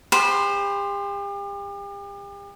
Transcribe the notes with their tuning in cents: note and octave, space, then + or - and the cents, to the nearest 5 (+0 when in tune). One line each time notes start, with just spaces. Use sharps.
G4 +40 C5 +0 B5 -10